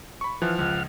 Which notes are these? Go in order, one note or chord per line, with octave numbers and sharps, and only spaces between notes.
B5 C#6
E3 F3 F#5 F6
C#2